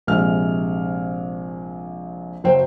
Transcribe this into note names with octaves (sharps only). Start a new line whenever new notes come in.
A#1 C3 G#3 F6
F#1 F#3 F#4 C5 G5